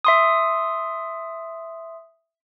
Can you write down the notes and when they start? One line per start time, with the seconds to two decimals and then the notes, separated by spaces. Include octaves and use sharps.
0.05 E5 C6 D#6